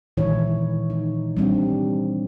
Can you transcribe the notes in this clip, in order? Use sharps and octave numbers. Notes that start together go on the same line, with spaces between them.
A#2 D#3 E3 G#3 E4 C#5
D#4
G3 C4 D4